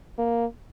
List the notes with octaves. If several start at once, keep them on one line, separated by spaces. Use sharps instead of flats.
A#3